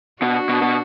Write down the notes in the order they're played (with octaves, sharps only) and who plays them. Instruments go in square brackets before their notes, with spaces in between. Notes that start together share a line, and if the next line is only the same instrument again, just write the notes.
[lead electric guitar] B2 [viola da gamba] D4 F#4
[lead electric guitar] B2
B2